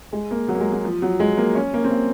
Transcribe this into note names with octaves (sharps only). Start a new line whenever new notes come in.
G#3
A#3
F#3
A#3
G#3
F#3
F3
F#3
G#3
A#3
C#4
A#3
C4
A#3